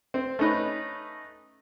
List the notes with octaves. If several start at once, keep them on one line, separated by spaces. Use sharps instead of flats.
C4
A3 C#4 D#4 B4